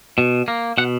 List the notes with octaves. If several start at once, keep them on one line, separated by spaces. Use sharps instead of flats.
B2
A#3
B2 F#5